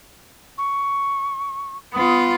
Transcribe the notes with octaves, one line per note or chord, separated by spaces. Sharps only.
C#6
B3 F4 D#6